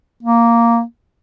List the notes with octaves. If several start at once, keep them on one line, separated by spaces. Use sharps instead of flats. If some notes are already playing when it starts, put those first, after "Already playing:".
A#3